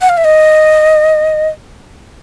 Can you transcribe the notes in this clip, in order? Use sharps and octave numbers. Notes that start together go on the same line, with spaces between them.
F#5
F5
E5
D#5